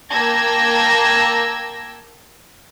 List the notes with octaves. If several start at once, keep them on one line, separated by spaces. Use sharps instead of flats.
A#3 G5 A5 E6 G#6 A#6